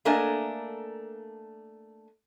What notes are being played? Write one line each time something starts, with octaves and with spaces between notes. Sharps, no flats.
A3 A#3 D4 A#4 D#5 G#5